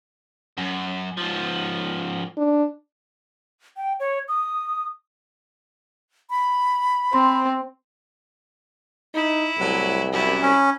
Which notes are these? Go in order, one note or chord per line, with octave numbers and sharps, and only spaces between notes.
F#2
G#2 F3
D4
G5
C#5
D#6
B5
C4 C6
D#4 E4
C2 A2 F#3
F#2 E4
C#4